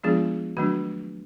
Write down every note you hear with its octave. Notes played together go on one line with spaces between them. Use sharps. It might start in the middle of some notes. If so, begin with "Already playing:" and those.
F3 G#3 B3 D4 F4 G#4
D#3 F#3 A3 D4 F#4